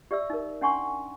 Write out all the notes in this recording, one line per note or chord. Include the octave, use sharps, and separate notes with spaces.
G4 D5 E5 E6
D#4 A#4
C#4 D4 F#5 G#5 C6 C#6